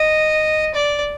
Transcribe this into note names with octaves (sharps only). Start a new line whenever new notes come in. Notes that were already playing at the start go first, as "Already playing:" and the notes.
Already playing: D#5
D5